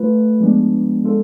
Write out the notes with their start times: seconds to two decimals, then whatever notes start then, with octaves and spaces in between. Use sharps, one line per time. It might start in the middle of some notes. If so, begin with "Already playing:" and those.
Already playing: A3 F4 B4
0.40 F3 G#3 B3 D4
1.04 G#3 D4 F4 A4